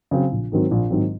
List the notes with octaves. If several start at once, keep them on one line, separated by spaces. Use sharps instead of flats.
C#3 F#3 C4
A#1
G#2 D#3 F#3 C4
A#1
G#2 D#3 F#3 C4